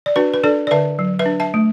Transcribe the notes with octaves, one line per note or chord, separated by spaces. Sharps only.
D5
D4 F#4 B4
B4
D4 A4 D5
D5
D3 B4 E5
F#3
B4 E5
D4
E5 A5
A3